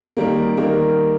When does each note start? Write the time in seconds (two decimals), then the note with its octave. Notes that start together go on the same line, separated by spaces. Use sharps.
0.17 D#3 G3 A#3
0.57 D#3 G3 A#3